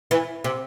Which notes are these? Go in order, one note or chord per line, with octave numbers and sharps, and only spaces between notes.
E3
C3